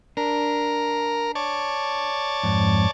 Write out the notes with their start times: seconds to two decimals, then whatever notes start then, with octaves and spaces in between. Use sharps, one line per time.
0.17 D4 A#4
1.35 C#5 D5 A5
2.43 F2 G#2